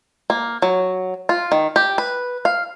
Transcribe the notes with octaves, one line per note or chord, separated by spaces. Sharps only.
A#3
F#3
F4
D#3
G4
B4
F5